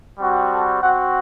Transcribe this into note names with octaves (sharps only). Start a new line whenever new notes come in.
G3 C4 F#4
A4
C4 F#4 F#5